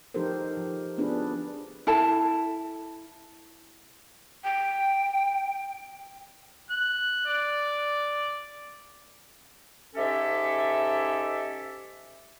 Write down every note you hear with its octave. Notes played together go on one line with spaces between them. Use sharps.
F3 D#4 G4 A4 A#4 C5
F3
B3 C4 D4 F4 G#4 B4
E4 A4 A5
G5
F#6
D5
G#2 C#4 G4 A4 E5